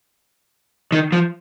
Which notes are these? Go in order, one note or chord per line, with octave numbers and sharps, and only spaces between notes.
D#3
F3